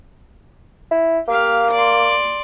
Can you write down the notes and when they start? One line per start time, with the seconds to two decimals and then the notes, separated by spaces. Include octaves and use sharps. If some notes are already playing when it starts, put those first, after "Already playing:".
0.91 E4
1.28 A#3 G4 F5
1.72 D5 C6